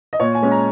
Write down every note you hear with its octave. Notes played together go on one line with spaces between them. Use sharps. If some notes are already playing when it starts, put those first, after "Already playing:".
D#5
A#2 C#5
G#5
G#3 C#4
A#5